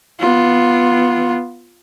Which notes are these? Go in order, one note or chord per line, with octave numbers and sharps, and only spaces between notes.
B3 F4